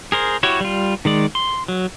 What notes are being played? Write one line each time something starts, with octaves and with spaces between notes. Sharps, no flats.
G#4 A#4 C5
E4 F#4 G4 C#5
G3 F4
D#3 G#3 D5
C6
F#3